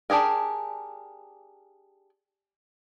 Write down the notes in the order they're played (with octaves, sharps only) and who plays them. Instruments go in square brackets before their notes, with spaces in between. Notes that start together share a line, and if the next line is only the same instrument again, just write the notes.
[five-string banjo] D4 G4 G#4 A#4